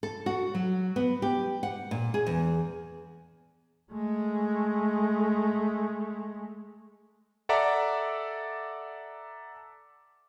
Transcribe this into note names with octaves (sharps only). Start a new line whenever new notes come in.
A4
F#4
F#3
B3
G4
F#5
A#2
G#4
E2
G#3 A3
A4 D5 E5 F#5 A#5 D6